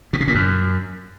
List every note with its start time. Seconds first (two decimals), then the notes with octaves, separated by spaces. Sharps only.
0.13 B2
0.20 C#3
0.28 A#2
0.35 F#2